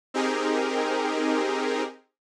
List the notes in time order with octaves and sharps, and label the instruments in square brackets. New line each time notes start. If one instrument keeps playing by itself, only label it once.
[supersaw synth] C4 D#4 G4 G#4 A#4